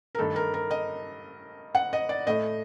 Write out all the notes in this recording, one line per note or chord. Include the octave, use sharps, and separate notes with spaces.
A#4
G2 D#3 A3 A4
A#4
A#4
D#5
F#5
D#5
D5
A2 A3 D#5